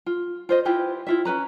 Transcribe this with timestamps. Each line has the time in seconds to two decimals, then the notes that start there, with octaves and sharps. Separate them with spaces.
0.06 F4
0.49 F4 C5 D#5
0.65 E4 F4 G4 B4
1.07 E4 F4 E5
1.25 C#4 D#4 B4 A#5